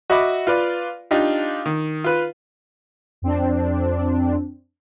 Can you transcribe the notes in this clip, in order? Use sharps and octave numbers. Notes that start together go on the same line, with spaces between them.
F#4 D#5 E5 B5 D6
F4 B4 D5
D4 D#4 F4 G4
D#3
F4 B4
F2 C4 D4